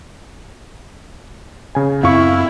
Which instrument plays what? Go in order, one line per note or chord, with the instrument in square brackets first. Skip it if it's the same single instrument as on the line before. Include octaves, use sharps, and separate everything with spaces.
[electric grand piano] C#3 G#5
[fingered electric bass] F#2 C4 [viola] E4 [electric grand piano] F5 C#6